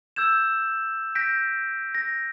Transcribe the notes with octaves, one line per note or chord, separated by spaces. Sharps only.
E6 G6 G#6 E7
G6 A#6 B6 D7
A#6